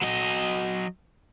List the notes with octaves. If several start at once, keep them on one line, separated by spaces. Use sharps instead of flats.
F#3 D#5